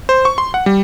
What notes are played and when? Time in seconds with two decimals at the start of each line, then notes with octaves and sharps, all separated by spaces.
0.09 C5
0.25 C#6
0.38 C6
0.54 F#5
0.66 G3